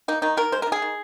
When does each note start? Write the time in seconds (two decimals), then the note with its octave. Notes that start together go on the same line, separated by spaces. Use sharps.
0.08 A#3 D#4
0.22 D#3 D#4
0.37 D#3 A#4
0.52 G#3 C5
0.62 A#4
0.67 D#3
0.72 G#4
0.82 D#3